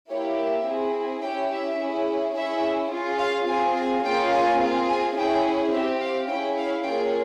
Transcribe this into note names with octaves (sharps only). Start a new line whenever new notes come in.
A#3 E4 G4 C#5
E5
C4 E4 G#4
C#4 E4 G4 G5
E5
C#4 E4 G#4
C#4 E4 G#4 E5
C#4 F4 G#4
F5
C4 F4 G#4 G#5
G#5
A#3 C#4 F4 G#4 G5
G#5
C4 F4 G#4
G#5
C#4 E4 G#4 G5
C4 G4 E5
F5
C#4 E4 G#4 G5
F5
A#3 C#4 F4 G#4 G5